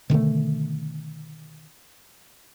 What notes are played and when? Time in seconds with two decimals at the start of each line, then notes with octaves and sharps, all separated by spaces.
0.10 B2 D3 D#3 A3